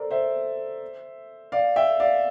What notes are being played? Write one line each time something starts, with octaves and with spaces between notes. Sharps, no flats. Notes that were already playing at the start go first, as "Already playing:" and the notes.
Already playing: A4 A#4 C5 D5
C5 E5
D5 F5
E5 G5
D5 F5